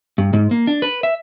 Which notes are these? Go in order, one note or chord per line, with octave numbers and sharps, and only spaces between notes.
G2
G#2
A#3
D4
B4
E5